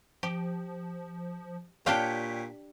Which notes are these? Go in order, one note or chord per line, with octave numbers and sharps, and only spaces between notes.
F3 G4
A#2 D4 G4 C#5 F5 G5 B6